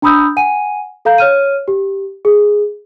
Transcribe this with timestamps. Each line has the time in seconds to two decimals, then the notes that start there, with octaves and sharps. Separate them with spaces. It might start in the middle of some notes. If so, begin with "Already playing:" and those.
0.02 D4 A#5 B5 D#6 E6 G6
0.37 F#5 G#5 D#7
1.05 A4 F5 A#5 G6
1.18 C#5 F6 D#7
1.68 G4
2.25 G#4